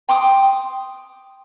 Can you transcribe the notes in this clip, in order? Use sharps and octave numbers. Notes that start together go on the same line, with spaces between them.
G5 C6 D6 D#6